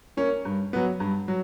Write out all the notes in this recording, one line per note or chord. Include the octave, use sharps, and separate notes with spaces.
A#3 C#4
G2
F#3 B3
G2
F#3